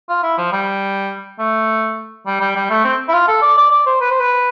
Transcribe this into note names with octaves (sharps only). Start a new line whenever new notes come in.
F4
E4
F3
G3
A3
G3
G3
G3
A3
C4
E4
F4
A4
D5
D5
D5
C5
B4
C5
B4